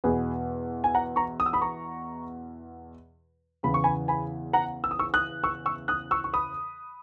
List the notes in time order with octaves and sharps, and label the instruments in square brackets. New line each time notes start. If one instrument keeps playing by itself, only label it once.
[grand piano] E2 B2 G#4 B4
G#5
F#5 A#5
A#5 C#6
D#6
E6
B5 D#6
A#5 C#6
E2 C#3 E3 B5
C#6
G#5 B5
G#5 B5
F#5 A#5
E6
D#6
C#6 E6
D#6 F#6
C#6 E6
C#6 E6
D#6 F#6
C#6 E6
C#6
B5 D#6